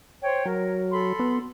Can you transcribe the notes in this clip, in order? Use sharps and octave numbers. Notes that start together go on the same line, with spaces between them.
C5 C#5 G5
F#3 A#4
A4 B5 C6
B3